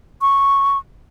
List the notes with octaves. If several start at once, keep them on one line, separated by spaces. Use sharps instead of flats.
C#6